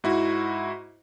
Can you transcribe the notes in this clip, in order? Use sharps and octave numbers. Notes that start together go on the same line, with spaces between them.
G#2 E4 F#4